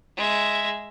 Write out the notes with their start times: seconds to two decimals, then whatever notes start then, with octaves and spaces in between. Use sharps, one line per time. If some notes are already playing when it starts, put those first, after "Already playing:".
0.17 G#3 E5